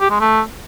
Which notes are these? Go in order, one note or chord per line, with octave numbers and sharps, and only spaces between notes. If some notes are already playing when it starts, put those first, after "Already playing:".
G4
G#3
A3